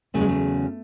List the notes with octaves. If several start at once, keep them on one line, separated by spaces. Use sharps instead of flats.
E2 C#3 F#3 A3
G#3
A3